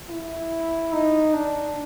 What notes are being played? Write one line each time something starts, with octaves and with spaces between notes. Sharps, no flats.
E4
D#4
D4